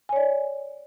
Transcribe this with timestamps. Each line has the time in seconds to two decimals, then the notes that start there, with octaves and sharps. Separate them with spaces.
0.09 G#5
0.13 C#5
0.16 D5